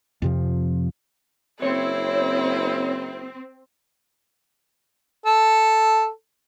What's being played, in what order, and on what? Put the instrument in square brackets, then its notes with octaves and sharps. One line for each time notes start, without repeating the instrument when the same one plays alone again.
[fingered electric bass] F2 C3 F3
[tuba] F#1 [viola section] C4 [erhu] E4 [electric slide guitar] C#5
[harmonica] A4